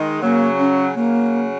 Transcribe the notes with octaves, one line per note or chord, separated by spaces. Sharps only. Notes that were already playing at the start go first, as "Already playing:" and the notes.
Already playing: D#3 G#3
C#3 F#3 A#3
C#4
C#3 F#3 A#3